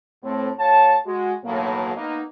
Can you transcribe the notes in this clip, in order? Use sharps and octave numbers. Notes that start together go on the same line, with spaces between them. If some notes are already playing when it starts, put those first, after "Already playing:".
A2 A3 C4
D2 C#5 F5 A5
G#3 F#4
B1 A2 D#3 E3 F#3 A#3
A#3 B3 D#4